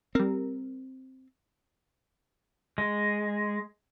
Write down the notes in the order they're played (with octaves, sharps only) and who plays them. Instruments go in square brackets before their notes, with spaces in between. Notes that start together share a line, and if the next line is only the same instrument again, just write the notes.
[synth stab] G3 A#4 [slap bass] C4
[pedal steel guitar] G#3